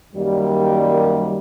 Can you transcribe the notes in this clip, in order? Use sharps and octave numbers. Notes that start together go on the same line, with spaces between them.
F#2 D#3 G3 A#3